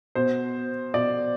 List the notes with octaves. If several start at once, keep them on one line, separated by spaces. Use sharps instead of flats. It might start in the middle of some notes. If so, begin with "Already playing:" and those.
B2 C5
B2 D5